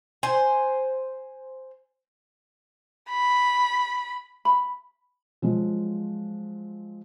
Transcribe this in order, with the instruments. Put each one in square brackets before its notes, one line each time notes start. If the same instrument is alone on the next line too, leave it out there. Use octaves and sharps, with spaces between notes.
[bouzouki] C5 G#5
[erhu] B5
[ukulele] B5
[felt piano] F3 F#3 G#3